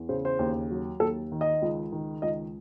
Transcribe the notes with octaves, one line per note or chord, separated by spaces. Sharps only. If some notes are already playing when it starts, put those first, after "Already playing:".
Already playing: E2
C#3 C5
C5
D#2
F#3
D#2 A4
D#3
D#5
C#2
D#3
C#2 D#5